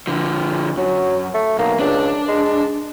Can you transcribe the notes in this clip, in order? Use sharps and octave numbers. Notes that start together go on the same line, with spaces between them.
D3 F3
F#2 F#3
A3
B1 A#3
C#2 D4
G#3